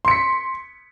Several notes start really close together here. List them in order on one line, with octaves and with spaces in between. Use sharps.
C6 C#7 B6